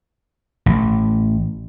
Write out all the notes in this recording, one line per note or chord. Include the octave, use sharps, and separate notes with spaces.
A1